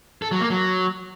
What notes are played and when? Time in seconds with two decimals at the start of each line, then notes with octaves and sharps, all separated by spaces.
0.22 A4
0.31 F#3
0.41 A#3
0.50 F#3